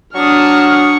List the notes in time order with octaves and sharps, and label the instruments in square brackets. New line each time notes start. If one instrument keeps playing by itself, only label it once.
[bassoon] F#3 [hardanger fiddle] D4 [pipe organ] C#6 [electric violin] D#6 F6